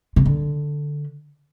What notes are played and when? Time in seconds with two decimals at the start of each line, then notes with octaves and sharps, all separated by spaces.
0.16 C3
0.26 D3